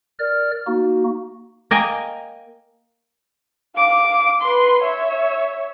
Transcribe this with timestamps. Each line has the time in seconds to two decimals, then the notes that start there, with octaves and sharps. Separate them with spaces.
0.19 A#4 D5 F6
0.67 A#3 D#4 F#4
1.71 A#3 D#5 G5 G#5
3.76 F5 D6
4.42 B4 C6
4.82 C#5 E5